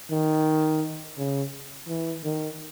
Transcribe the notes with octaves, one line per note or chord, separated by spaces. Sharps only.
D#3
C#3
E3
D#3